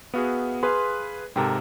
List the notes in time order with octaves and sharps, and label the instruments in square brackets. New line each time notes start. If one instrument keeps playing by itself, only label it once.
[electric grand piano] B3 F#4 G#4 [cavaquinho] E5 F5
[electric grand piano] G#4 B4 [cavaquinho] F5 C6
[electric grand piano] G#2 C3 [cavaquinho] A4 A#4 G5